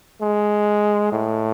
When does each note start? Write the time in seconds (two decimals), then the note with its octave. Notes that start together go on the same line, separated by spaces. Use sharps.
0.21 G#3
1.12 A2